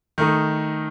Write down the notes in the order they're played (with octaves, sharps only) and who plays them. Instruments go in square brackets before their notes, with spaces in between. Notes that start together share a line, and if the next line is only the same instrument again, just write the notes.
[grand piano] D#3 A3 D#4